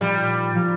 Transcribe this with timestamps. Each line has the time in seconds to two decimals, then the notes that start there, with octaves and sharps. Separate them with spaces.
0.01 A#2 F3 G3 D#4 G4
0.54 A#2 F3 D#4 G4